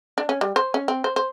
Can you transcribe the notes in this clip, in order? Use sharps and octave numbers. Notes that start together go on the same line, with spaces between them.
D4
C#4
G3
C5
C#4
C4
C5
C5